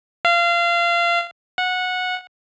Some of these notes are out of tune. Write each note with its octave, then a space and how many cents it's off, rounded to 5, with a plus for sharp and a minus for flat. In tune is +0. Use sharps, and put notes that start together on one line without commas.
F5 -25
F#5 -15